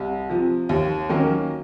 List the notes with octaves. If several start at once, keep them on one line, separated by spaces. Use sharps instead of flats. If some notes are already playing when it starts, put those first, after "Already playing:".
Already playing: C2
C3 F3
D#2
D#3 F#3 A#3 C#4